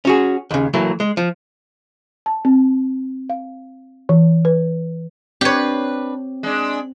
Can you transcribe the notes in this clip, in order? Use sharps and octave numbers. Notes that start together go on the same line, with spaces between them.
C#4 F#4 G#4
D#2 C#3
E3 F#3 A3 A#3
G#3
F3
A5
C4
F5
E3
B4
C4 D4 G4 B4 C#5
G#3 D4